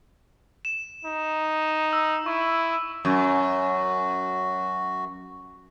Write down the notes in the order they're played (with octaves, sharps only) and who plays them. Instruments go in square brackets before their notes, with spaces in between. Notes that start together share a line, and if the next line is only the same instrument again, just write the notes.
[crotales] E7
[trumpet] D#4
[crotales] E6
[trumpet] E4 [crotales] C#6
[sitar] F#2 [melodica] F#4